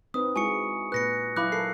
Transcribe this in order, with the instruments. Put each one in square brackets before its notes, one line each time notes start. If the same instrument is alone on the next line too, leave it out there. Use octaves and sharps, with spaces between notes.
[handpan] C4 D#4 B4 [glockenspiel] D#6
[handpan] G#3 E4 F#4 [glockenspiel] G#5 C#6 C#7
[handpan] A#2 B4 [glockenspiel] F#6 A#6 C#7
[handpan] F#3 E4 F5 [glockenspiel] B5 D6 F#6
[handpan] A4 A#4 [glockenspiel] C7